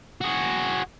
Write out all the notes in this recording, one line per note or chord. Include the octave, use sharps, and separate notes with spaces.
F#4 G#4